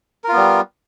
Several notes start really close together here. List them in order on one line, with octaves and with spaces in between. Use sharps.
A#4 F4 B3 G3